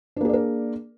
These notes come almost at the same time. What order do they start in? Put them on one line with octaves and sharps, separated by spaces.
D4 A#3 G#4 D5 A#4